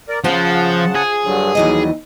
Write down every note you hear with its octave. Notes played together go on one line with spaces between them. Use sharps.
A#4 D5
C#3 F3 F4 C5 F#5 A5
G#4
G2 D3 F#3
D#2 E3 F#3 G3 D#5